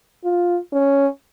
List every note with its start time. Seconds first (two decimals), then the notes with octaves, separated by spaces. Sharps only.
0.24 F4
0.73 C#4